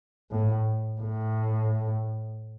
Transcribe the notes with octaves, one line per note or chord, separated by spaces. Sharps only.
A2
A2